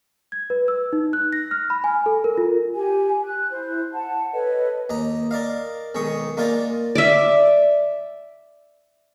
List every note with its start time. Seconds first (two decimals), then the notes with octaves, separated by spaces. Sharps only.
0.32 G#6
0.50 B4
0.68 E6
0.93 D#4
1.13 F#6
1.33 A#6
1.51 F6
1.70 B5
1.84 G#5
2.06 A4
2.24 A#4
2.38 F4
2.76 G4 G#5
3.24 F#6
3.51 E4 C5
3.93 F#5 A5
4.33 A4 B4 C#5 D#5
4.89 D#2 D#5 A#5
5.31 A#4 D5 D#5 F5
5.95 B1 D#3 G#3 C#6 D#6
6.37 A#3 D#4 F4 A#4 D5 G#5
6.95 D5 E5